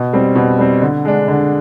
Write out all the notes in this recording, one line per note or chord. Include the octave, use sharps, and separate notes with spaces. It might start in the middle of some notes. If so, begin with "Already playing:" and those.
Already playing: B2
G3 C4
B2
G3 C4
D3
G#3 D4
D3